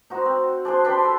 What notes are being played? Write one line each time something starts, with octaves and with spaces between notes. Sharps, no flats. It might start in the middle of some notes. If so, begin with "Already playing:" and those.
D#4 F#4 C5
C4
D4 G#4 C5
D4 G4 B4 C6
A4